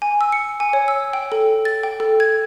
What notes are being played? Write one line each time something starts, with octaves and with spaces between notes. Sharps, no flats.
G#5
E6
C#7
G#5
C#5
E6
G5
A4
A6
G5
A4
G#6